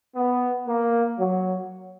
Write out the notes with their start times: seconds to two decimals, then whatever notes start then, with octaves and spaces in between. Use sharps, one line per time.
0.15 B3
0.66 A#3
1.19 F#3